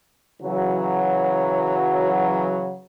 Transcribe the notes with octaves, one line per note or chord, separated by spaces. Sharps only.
C#3 E3 F#3